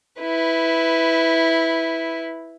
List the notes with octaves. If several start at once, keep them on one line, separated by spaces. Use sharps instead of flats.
E4 B4